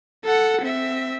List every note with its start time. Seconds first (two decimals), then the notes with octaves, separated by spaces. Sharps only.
0.25 A4 F#5
0.61 C4 E5